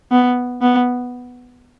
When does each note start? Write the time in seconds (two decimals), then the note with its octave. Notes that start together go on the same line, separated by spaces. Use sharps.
0.12 B3
0.62 B3